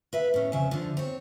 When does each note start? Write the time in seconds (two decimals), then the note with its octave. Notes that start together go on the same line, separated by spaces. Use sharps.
0.13 B4 E5 F5
0.34 A2 C#4
0.52 F2 C#3 E5
0.71 D3 F3
0.97 C4 C#5